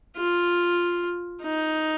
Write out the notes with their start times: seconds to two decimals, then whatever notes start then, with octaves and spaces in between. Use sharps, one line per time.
0.17 F4
1.42 D#4